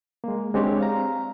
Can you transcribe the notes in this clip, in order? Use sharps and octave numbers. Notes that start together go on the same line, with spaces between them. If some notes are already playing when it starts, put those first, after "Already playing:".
G#3 A#3
G#3 C4 D4 G4 C#5
F5 A#5